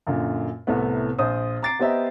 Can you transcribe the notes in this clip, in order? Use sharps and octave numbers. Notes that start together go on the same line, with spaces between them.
F#2 A#2 D3
C2 A2 C3 A3 B3
A#1 C5 D#6
A#5 D6 A6 C7 D7
B3 G4 C5 D#5 E5 A#5